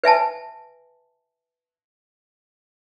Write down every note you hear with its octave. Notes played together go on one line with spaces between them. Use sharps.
B4 E5 G#5 A5